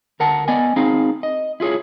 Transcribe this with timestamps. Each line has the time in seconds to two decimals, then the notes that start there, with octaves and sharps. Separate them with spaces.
0.20 D2 A#4 F#5 A5
0.48 B3 D5 D#5 G#5
0.76 C4 D#4 G#4 F5
1.23 D#5
1.60 E4 F4 G#4 C#5